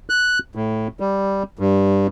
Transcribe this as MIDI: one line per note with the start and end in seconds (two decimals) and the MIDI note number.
0.10 0.39 90
0.55 0.88 45
1.00 1.43 55
1.59 2.07 43